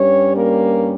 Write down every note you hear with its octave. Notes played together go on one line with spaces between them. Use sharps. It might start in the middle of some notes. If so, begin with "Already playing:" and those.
Already playing: G2 G3 C#4 C#5
A#3 A#4